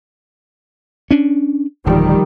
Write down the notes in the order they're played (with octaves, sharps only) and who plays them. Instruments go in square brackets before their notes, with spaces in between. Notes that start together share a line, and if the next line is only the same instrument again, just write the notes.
[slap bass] C#4 D4
[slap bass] D1 [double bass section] D#3 F3 G3